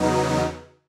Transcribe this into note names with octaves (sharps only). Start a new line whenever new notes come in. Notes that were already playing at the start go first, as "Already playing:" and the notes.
Already playing: E2 C#3 F#3 B3 D#4